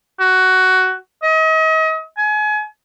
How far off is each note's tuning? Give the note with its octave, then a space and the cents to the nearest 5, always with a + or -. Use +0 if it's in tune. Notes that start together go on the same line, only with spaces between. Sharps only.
F#4 +10
D#5 +40
G#5 +30